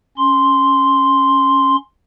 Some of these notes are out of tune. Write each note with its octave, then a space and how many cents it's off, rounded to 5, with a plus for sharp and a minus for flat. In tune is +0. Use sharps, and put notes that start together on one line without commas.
C#4 +0 C6 +0